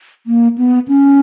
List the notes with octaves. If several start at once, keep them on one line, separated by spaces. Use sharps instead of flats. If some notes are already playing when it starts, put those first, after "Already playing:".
A#3
B3
C#4